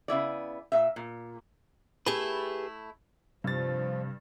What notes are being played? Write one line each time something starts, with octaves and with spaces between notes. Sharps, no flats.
C#3 B3 E4 D5
A#2 E5
A#2
A3 E4 G4 G#4 B4
G2 C3 F3 A6